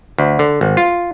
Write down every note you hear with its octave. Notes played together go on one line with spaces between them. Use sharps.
D2
D3
G#1
F4